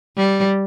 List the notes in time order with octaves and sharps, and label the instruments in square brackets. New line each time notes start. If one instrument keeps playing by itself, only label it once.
[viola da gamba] G3